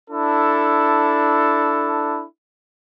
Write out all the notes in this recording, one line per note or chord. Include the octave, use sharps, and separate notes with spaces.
D4 E4 A4